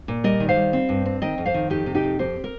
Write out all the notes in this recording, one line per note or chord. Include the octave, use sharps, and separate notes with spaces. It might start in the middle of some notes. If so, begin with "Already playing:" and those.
A#2
G3 A#4 D#5
D#3
C5 F5
G3
C4
G2
C4
D#3 D#5 G5
F2
C5 F5
D#3
F2 D#4 G4
C3
D#4 G4
F2
F2 G4 C5
C4
A#4